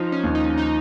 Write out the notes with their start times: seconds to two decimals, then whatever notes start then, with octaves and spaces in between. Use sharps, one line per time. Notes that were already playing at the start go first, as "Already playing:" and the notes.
Already playing: F3 D#4 C5
0.12 C#4
0.24 D#2
0.35 D#4
0.58 D#4